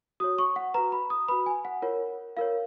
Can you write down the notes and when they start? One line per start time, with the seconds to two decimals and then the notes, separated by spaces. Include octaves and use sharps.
0.20 F#4 C#5 D#6
0.38 C#6
0.56 F#5
0.74 F#4 B4 A#5
0.92 B5
1.10 D#6
1.28 F#4 B4 B5
1.46 G#5
1.65 F#5
1.82 F4 A#4 C#5
2.37 F4 A#4 C#5 F5